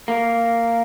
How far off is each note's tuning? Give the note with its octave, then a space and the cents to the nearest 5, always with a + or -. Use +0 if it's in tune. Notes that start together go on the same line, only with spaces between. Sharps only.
A#3 -10